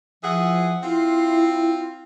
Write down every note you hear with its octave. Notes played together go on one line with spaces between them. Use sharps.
E3 F3 G#4 F#5
C4 E4 F4